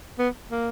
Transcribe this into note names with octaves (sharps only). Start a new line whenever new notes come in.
B3
A#3